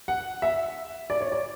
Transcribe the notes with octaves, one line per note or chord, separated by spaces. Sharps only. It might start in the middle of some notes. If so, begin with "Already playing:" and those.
F#5
E5
D5
C#5
D5